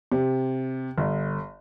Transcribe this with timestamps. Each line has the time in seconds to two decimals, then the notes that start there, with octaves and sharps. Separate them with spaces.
0.12 C3
0.98 G1